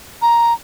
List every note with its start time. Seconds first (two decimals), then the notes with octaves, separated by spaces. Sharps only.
0.22 A#5